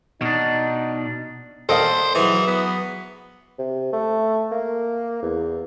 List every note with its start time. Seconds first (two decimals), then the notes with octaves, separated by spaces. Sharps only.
0.22 B2 D4 D#4
1.69 D#3 A4 C5 D5 D#5 F5
2.15 E3 F#3 G#4
2.47 B3
3.59 C3
3.93 A3
4.52 A#3
5.22 E2